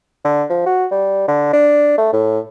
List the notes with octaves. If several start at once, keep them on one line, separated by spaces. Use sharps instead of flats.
D3
F3
F#4
G3
D3
D4
A3
A2